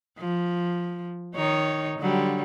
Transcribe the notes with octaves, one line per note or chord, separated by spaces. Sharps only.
F3
D#3 D#4 C#5
D3 F#3 G3